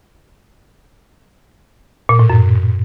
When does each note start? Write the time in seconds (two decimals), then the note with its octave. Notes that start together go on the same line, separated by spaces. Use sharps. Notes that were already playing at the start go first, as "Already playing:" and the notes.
2.09 A#2
2.19 A2
2.30 F#2